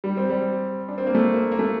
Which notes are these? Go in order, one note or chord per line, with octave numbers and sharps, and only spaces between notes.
G3
C4
G3
D4
C4
A#3
A3
A#3
A#3
A3